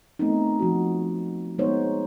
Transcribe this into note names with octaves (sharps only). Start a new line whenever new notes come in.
A3 B3 C4 D#4
F3 F#4
G#3 B3 D#4 C5 C#5